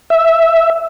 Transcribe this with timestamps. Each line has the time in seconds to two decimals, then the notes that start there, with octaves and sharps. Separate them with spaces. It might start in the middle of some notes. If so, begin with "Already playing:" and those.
0.10 E5